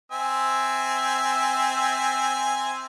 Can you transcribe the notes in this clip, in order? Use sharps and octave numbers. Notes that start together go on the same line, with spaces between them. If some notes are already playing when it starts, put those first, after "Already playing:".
C4 E5 G#5